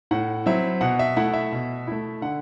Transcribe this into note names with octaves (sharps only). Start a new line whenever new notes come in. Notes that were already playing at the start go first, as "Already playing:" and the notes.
A2 F#5
F#3 C4 E4 E5
B2 F#5
E5
A3 E4 F#5
E5
B2
A3 E4
D3 F#5